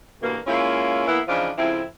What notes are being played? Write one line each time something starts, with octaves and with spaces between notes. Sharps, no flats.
D2 G2 B2 E3 A#3
G#3 A#3 C#4 E4 F4
E3 A#3 B3 E4
C#3 E3 F3 D4 D#4 F4
F2 C#3 F3 C4 E4